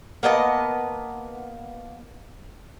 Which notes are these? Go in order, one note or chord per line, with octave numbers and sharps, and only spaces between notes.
A#3 B3 D#5 A5